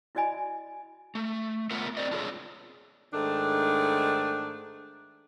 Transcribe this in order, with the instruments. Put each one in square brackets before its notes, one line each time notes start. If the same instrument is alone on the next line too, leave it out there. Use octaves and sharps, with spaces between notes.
[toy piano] E4 F#4 D5 D#5 G#5 B5
[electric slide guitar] A3
B3 F4 A#4 E5 F#5
C4 C5 D5 D#5
D4 F4 G#4 A4 C#5
[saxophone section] G#2 D#3 A3 D4